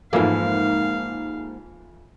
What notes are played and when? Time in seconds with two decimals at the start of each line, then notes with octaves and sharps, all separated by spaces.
0.13 F2 G#2 E3 A3 A#3 F5